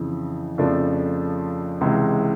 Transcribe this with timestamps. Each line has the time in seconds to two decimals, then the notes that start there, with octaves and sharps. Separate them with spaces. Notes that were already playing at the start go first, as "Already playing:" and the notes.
Already playing: F2 C#3 E3
0.58 F2 C#3 F3 A3 D4
1.81 C#2 C3 E3 G#3